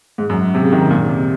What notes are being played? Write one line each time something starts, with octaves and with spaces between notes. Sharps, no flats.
G#2
F#2
C3
C#3
D#3
C3
A#2
C3